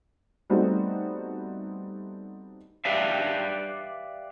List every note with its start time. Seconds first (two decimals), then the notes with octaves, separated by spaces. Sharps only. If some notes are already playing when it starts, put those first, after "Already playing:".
0.50 G3 A3 B3 C4 D#4 F#4
2.85 G4 B4 D5 E5 F5